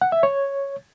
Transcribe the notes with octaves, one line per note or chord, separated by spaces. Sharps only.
F#5
E5
C#5